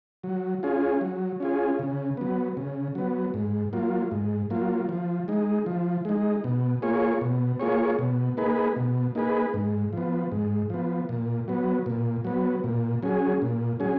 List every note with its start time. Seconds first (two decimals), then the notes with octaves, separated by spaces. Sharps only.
0.24 F#3
0.63 C#4 F4 G#4
1.01 F#3
1.40 C#4 F4 G#4
1.79 C#3
2.17 F#3 B3
2.57 C#3
2.95 F#3 B3
3.34 G#2
3.73 F#3 A#3 F4
4.11 G#2
4.50 F#3 A#3 F4
4.89 F3
5.28 G#3 D#4
5.66 F3
6.05 G#3 D#4
6.44 B2
6.82 A#3 F4 G#4 C#5
7.21 B2
7.60 A#3 F4 G#4 C#5
7.99 B2
8.37 A#3 D#4 G#4 B4
8.76 B2
9.15 A#3 D#4 G#4 B4
9.54 G#2
9.93 F3 B3
10.32 G#2
10.70 F3 B3
11.09 A#2
11.48 F#3 B3
11.86 A#2
12.25 F#3 B3
12.64 A#2
13.03 F#3 C#4 G#4
13.42 A#2
13.80 F#3 C#4 G#4